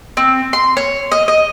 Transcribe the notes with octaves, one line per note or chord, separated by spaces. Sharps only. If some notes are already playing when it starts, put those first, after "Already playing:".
C4
C6
C#5
D#5
D#5